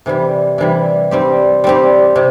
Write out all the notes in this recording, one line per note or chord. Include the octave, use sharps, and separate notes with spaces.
C3 E3 G3
C3 E3 G3
G3 C4 G4
G3 C4 G4
C3